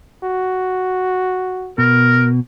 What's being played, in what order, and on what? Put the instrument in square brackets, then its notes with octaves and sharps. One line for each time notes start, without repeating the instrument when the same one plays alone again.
[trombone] F#4
[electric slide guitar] B2 [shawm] A#4